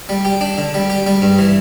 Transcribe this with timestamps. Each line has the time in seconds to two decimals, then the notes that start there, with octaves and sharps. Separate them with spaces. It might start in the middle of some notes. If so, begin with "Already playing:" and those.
0.09 G3
0.25 G4
0.41 D4
0.58 D3
0.74 G3
0.90 G4
1.07 G3
1.22 G2
1.39 E3